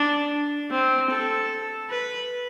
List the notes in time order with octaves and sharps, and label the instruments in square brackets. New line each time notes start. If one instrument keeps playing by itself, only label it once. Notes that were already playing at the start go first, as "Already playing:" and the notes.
Already playing: [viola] D4
C4
A4
B4